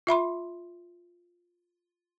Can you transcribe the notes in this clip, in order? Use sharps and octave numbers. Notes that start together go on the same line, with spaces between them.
F4 E5 B5 C6